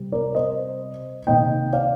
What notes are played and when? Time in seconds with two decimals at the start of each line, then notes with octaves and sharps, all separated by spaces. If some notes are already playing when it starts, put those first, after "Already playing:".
Already playing: C3 G3
0.12 A#4 D5
0.35 C5 D#5
1.27 C3 D#3 A#3 D#5 G5
1.73 D5 F5